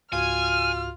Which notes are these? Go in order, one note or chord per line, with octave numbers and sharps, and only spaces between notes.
C#2 G#2 F4 F#4 G#5 F6